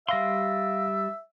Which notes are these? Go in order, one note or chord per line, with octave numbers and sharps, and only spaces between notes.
G3 E5 F5 C6 A#6